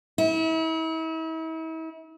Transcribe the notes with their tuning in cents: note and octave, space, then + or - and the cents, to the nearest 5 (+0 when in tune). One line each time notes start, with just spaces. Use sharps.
E4 -40